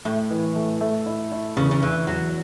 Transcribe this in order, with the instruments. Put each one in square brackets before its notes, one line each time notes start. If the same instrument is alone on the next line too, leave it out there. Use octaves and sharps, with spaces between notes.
[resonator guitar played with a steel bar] A2 [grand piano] A3
[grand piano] E3
A3
A3
E4
E4
[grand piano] E2 [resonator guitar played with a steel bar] C#3
[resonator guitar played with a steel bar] C#3
[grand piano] E2 [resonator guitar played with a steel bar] E3
[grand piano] E2 [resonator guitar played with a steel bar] F#3